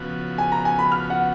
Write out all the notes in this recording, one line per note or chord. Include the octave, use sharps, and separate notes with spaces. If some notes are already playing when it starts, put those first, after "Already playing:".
Already playing: C#3 F3 B3 F#4
G#5
A#5
G#5
B5
F6
F#5